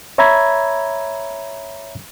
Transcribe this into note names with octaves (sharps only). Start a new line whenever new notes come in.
C#5 E5 A#5 B5 G#6